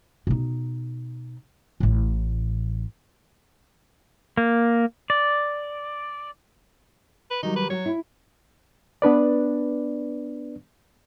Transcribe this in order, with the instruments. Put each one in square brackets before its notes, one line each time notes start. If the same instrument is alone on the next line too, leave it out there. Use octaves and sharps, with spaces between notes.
[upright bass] B2 D#4
A1 A2
[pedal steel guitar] A#3
D5
[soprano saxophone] B4
[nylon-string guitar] D#3 F#3 G3 [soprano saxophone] D#4
[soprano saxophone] B4
[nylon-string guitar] F#3 [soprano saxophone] C#5
[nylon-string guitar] E4
[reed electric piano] B3 D4 B4 D5